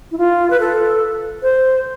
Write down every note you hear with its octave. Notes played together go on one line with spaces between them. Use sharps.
E4
F4
B4
A4
C5